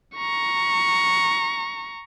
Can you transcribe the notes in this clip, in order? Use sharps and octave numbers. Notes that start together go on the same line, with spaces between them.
A#5 C#6